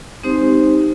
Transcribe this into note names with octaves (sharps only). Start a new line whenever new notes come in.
G#3 C4 D#4 G4 C5